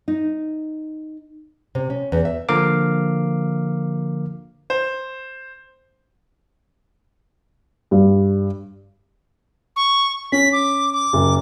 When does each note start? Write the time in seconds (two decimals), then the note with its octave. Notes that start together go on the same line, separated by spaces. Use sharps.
0.08 D#4
1.75 C3
1.90 C#4
2.12 E2
2.25 E5
2.49 D3 F3 A#3 A#4 F5 D6
4.70 C5
7.91 G2
9.76 C#6
10.32 C#4 B6
10.53 D6
10.93 D6
11.13 F#1